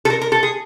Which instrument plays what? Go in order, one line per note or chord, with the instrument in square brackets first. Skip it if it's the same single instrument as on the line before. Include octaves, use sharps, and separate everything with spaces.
[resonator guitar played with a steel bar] A4
A#4
A#4
A4
G#4